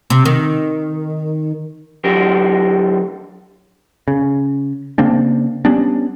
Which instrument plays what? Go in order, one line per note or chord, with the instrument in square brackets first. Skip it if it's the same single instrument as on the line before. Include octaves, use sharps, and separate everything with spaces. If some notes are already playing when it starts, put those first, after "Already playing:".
[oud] C3
D#3
[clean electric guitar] D3 F#3 G4 A#4
[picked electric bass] C#3
C#3 A#3 C4 D4
G3 B3 C#4 D4